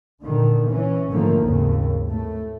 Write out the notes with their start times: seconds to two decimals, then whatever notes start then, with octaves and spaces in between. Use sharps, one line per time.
0.21 A#2 D3 D#3
0.68 E3 C#4
1.09 G#2 D3 D#3 F3 A3 A#3
1.41 G#1 D#2 C#3
2.09 A2 A3